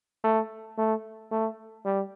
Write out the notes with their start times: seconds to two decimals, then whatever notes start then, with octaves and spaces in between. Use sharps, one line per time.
0.24 A3
0.78 A3
1.31 A3
1.85 G3